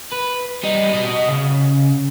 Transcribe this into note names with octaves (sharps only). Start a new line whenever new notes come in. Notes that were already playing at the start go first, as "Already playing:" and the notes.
B4
G3 D#4
F#4 D#5
C#3